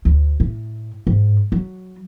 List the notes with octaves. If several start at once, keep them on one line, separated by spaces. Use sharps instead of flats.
D2
A2
G#2
F#3